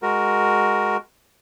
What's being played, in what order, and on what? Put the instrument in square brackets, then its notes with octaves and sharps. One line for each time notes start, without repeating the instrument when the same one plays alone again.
[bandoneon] G#3 F#4 A#4